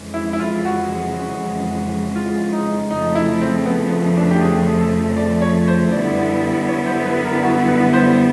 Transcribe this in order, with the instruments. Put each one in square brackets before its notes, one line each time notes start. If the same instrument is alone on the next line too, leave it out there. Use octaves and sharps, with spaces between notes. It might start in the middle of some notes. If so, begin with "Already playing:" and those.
Already playing: [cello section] F2 C#3 E3 G#3
[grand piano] E4
E4
F4
F#4
F4
D#4
[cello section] F2 C#3 F3 A3 [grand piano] D#4
[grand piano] E4
C4
B3
B3
D4
G4
G#4
A4
D5
C#5
C5
[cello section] F#2 D3 G3 B3 E4 [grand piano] D5
[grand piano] C#5
C5
B4
A#4
F#4
B4
C5